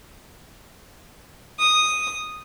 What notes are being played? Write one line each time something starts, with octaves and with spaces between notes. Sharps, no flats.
D#6